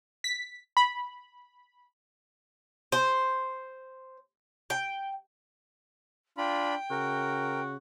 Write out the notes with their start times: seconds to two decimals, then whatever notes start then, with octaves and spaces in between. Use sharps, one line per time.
0.24 B6
0.77 B5
2.92 C5
4.70 G5
6.38 D4 F4 G5 B5
6.91 C#3 F#4 A#4